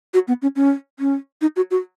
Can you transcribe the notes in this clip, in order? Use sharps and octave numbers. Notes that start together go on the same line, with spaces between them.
F#4
B3
C#4
C#4
C#4
D#4
F#4
F#4